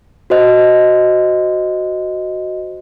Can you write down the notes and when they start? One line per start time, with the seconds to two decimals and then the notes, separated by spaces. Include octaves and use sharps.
0.30 F#4 C5 D#5